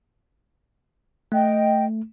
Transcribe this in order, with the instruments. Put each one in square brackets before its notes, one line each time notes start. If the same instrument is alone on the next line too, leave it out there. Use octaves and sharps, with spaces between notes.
[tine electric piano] A3 [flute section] D#5 G5